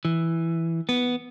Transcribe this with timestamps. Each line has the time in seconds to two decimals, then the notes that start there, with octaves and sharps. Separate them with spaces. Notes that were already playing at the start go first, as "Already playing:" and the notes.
0.05 E3
0.89 B3